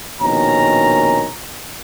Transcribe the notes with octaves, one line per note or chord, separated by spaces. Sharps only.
A#1 B2 D#3 C#4 A#5